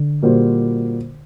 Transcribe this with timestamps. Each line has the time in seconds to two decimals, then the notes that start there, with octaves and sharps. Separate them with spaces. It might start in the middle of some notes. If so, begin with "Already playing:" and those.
Already playing: D3
0.22 A#2 G3 A#3 F#4 C5